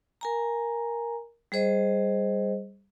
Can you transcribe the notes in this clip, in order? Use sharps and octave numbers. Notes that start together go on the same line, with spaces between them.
A#4 G#5 A#5
G3 G#4 C5 D#5